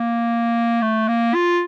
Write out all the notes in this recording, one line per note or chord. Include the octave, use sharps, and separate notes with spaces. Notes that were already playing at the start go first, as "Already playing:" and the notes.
Already playing: A#3
A3
A#3
F4